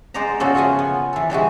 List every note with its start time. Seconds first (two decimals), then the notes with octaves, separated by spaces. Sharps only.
0.14 G#3 C5 D5 F#5 A#5
0.40 C#3 F3 A#3 B3 F#4 A4
0.55 F4 E5 F#5 G#5
0.79 B3
1.13 E3 A4
1.30 E3 G3 G#3 F#4